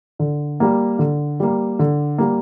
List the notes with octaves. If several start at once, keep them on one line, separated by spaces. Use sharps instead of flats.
D3
G3 A#3
D3
G3 A#3
D3
G3 A#3